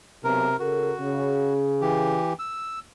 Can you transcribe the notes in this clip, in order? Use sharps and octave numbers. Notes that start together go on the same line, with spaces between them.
B1 C3 A#4
C#3 F#4 A4 A#4
C#3
E3 G4
E6